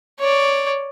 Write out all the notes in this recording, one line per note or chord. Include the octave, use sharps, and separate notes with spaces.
C#5 D5